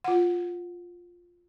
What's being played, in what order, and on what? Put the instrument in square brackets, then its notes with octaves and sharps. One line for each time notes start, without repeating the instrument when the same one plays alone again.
[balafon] F4 F#5